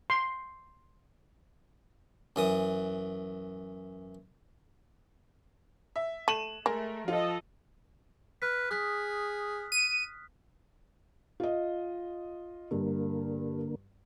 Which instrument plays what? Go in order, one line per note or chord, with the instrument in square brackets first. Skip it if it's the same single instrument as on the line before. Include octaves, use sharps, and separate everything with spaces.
[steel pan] C6
[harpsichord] F#2 E3 D#6
[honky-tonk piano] E5
[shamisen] A3 [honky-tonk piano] D#7 E7 F#7
[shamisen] G#3 [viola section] A3 [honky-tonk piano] A#4
[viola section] F3 A4 D#5 [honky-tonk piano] F4
[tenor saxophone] B4 [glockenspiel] F6 B6
[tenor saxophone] G#4 [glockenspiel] D#6 F#6 B6
[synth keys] D#7
[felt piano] F4 D#5
[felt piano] G2 [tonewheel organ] D3 A#3